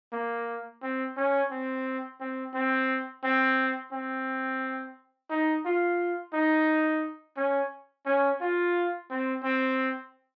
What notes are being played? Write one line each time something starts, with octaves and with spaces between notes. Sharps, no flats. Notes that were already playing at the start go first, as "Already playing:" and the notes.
A#3
C4
C#4
C4
C4
C4
C4
C4
D#4
F4
D#4
C#4
C#4
F4
C4
C4